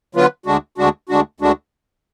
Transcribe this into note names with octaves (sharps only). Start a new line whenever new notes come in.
D3 F#3 B3 F4 B4
D2 D3 G#3 D4 F#4
D2 D3 G#3 D4 F#4
D2 D3 G#3 D4 F#4
D2 D3 G#3 D4 F#4